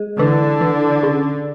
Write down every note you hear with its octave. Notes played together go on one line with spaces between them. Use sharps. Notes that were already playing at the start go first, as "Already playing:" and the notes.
Already playing: G#3
D3 E3
E3
C#3